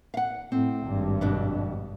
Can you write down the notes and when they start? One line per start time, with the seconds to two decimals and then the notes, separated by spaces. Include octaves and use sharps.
0.14 F5 F#5
0.52 A2 C4
0.86 G#1 G2
1.21 F2 B2 D4